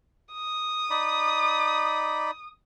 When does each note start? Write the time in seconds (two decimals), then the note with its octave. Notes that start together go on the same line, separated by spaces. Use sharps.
0.34 D#6
0.90 D#4 D5 B5